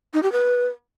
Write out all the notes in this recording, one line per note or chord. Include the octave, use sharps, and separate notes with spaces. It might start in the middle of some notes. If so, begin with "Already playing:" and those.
D#4
G4
B4